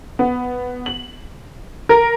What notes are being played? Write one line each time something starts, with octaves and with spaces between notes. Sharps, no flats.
B3
F#7
A#4